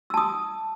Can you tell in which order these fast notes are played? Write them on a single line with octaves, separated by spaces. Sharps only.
E6 A5 D#6